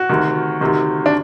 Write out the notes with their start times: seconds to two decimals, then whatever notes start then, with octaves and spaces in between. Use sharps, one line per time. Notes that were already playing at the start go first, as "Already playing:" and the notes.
Already playing: F#4
0.09 D2 C3 D#3
0.61 D2 C3 D#3
1.06 D4